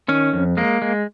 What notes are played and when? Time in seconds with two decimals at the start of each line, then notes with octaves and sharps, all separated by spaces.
0.08 D#3 C#4
0.33 F2
0.57 G#3 A#3
0.82 G#3